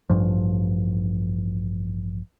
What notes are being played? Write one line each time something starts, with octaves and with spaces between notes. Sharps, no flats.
A1 G2 F3